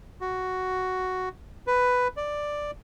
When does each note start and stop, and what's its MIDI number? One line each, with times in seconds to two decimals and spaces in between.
0.21 1.29 66
1.67 2.08 71
2.17 2.71 74